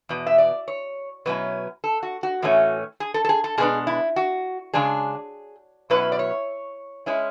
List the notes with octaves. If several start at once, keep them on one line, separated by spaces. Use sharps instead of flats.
E2 B2
E5
D5
C#5
B2 F#3 C#4 E4 B4
A4
F#4
F#4
A2 E3 A3 C#4
G#4
A4
A4
G#4
A4
B2 G#3 B3 D4 G#4
E4
F#4
C#3 G#3 D4 G#4
B2 F#3 C#4 E4 B4
D5
C#5
G#3 C#4 E4